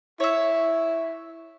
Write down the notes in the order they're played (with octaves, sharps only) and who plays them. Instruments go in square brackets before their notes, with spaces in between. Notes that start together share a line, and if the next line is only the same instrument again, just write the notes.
[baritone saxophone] E4 [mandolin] C#5 E5